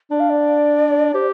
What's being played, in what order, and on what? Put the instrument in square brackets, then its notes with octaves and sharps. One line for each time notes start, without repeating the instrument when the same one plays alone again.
[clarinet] D4 [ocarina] D5
[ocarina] F5
D5
[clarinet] G4 [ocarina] C5